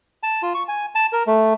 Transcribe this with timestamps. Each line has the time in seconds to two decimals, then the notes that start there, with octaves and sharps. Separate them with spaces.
0.23 A5
0.42 F4
0.54 C#6
0.68 G#5
0.95 A5
1.12 A#4
1.27 A3